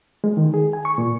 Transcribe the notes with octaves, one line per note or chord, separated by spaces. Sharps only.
G#3
D#3
G#4
G#5
C#6
A#2